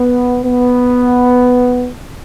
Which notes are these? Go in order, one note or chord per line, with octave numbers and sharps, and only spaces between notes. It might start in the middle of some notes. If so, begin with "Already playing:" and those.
Already playing: B3
B3